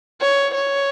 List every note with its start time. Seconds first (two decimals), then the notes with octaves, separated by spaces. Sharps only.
0.21 C#5
0.54 C#5